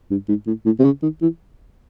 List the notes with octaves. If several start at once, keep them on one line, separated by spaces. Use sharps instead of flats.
G2
G#2
A2
A2
C3
C#3
D#3
E3